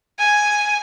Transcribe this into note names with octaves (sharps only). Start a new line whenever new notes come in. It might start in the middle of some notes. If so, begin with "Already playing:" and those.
G#5